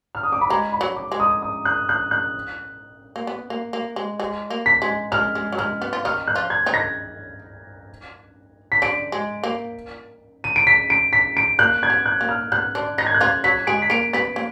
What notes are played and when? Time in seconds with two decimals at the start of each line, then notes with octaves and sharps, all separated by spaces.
0.15 F6
0.23 D#6
0.32 D6
0.41 B5
0.49 G#3 A#5
0.73 B5
0.81 F#3
0.96 D6
1.12 G#3
1.20 D#6
1.42 D#6
1.65 F#6
1.89 F#6
2.11 F#6
3.16 A#3
3.27 B3
3.50 A#3
3.73 A#3
3.96 G#3
4.20 G#3
4.50 A#3
4.66 B6
4.82 G#3
5.12 G#3 F6
5.35 G#3
5.52 F#3
5.58 G#3 F6
5.82 B3
5.93 F4
6.05 D#3 D#4 F6
6.28 F#6
6.35 F3 F4
6.50 G#6
6.66 D#3 D#4
6.74 A#6
8.72 B6
8.82 D3 D4 D7
9.12 G#3
9.44 A#3
10.44 D#7
10.56 D7
10.67 B6
10.90 D7
11.13 B6
11.37 D7
11.59 A#3 F#6
11.83 G#6
11.90 B3
12.06 F#6
12.21 A#3
12.29 F6
12.52 B3 F#6
12.75 D3 D4
12.98 D#3 D#4 A#6
13.06 G#6
13.14 F#6
13.21 F3 F4 G#6
13.44 F#3 F#4 B6
13.67 G#3 G#4 D7
13.82 B6
13.90 A#3 A#4 D7
14.13 B3 B4 B6
14.36 A#3